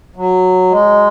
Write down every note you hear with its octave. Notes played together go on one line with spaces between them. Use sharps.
F#3
G#3